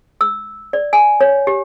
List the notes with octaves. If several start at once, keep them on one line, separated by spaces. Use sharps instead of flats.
E6
D5
G#5
C#5
G4